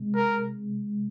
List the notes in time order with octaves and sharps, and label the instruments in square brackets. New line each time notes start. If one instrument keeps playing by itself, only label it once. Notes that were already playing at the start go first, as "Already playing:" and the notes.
Already playing: [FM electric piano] C3 G#3
[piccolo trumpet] A#4